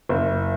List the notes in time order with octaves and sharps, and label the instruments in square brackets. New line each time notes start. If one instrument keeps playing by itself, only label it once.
[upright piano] F#1